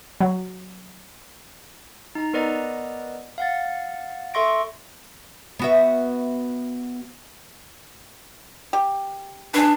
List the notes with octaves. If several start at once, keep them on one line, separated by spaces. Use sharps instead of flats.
F#3
D#4 A#5
B3 A#4 B4 D5 D#5 A#5
F5 F#5 A6
A4 E5 C6 C#6 A#6 D7
B3 F#4 E5
G4
D4 G#4 B4